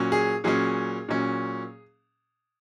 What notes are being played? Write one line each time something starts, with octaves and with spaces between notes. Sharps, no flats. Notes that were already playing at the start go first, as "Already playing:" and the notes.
Already playing: A#2 F#3 C#4
G#4
A#2 F#3 C#4 G#4
A#2 F#3 C#4